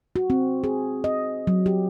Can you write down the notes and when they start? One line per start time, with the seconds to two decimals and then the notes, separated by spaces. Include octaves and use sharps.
0.16 F#4
0.30 C4
0.64 G#4
1.04 D#5
1.47 F#3
1.66 G4